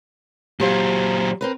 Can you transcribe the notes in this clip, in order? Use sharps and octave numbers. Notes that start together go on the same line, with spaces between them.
A#2 F#3 G4 C5 F5
C4 A#4 B4